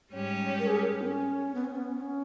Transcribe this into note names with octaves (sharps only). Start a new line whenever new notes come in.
G#2 G3 C#4 G4 C#5
A#4
G#4
A#4
B3
C#4
B3
C#4
B3
C#4